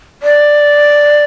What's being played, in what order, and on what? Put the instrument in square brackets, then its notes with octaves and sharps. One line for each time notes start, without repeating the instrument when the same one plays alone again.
[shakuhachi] D5